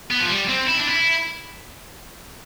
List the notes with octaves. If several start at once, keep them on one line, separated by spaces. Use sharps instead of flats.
B3
F3
G3
C4
E4
D4
E4